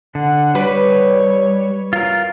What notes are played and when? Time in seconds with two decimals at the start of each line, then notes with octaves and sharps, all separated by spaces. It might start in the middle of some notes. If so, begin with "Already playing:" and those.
0.15 D3 F#5
0.55 G3 B4 C#5
1.93 F4 A#4